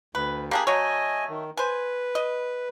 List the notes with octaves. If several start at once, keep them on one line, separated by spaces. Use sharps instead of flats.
D2 B4
A#3 D4 G4 G#4 B5
F#3 A3 C#5 D#5 G#5
D#3
B4 C5 G#5
D#5